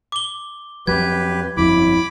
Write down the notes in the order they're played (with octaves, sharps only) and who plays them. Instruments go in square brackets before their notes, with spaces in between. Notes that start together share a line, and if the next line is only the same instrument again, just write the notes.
[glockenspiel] D6 G7
[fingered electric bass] F2 F#3 [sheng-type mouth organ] G4 B4 [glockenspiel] G#6
[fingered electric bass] G1 F2 F#3 [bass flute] E4 [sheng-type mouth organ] B5 D6